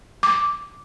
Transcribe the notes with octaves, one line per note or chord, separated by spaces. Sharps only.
D6